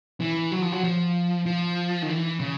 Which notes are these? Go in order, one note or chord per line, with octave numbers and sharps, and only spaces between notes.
E3
F#3
F3
F#3
F3
F3
D#3
E3
C#3